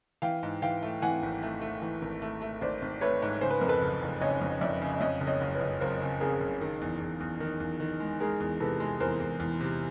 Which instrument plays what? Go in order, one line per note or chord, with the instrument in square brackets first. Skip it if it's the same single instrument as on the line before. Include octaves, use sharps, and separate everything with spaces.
[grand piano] E3 [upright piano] F5 G5
[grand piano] G#2
[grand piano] E3 [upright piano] F5 G5
[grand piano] A3
[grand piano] E3 [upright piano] F#5 G#5
[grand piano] G#1
A3
A3
E3
G#1
A3
A3
[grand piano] G#1 [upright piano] C5 D5
[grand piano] G#1
[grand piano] A3 [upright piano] B4 C#5
[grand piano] G#2
[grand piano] C#3 [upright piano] C5
[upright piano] B4
[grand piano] F2 [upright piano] A#4
[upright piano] A4 B4
[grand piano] F#1
F#1
[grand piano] C#3 [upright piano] C#5 D#5
[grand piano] F2
[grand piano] F2 [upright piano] D5 E5
[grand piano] C#3
[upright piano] E5
[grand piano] F2 [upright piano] C#5 D#5
[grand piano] F#1
[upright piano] C#5 D#5
[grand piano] F#1
[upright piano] B4 C#5
[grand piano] F#1
[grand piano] F#1 [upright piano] A#4 C5
[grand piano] C#3
[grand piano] C#3 [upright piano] G#4 A#4
[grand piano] F#1
D#3
E2
E2
E2
D#3
E2
D#3
G#3
[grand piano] G#3 [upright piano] G#4 A#4
[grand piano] E2
[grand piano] C3 [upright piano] A4 B4
[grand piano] G#3
[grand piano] E2 [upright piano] A#4 C5
[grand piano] E2
E2
C3